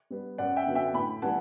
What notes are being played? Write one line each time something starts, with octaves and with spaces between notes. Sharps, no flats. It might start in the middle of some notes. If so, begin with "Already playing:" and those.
G3 B3
F#2 D5 F#5
E5 G5
D3 F#3 B3
E5 G5
A2 G5 B5
E3 G3 F#5 A5